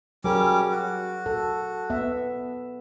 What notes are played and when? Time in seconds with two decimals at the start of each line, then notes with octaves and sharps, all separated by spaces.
0.24 F#3 G3 C#4 G#4 A#4 D6
0.71 F#4
1.26 A4
1.90 B3 E5